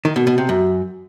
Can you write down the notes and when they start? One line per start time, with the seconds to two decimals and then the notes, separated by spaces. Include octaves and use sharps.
0.05 D#3
0.16 B2
0.27 B2
0.38 C3
0.49 F#2